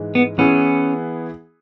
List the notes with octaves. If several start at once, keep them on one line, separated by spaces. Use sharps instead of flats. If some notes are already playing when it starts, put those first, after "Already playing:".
Already playing: G#2 E3 G#3
B3
E3 B3 C#4 E4 G#4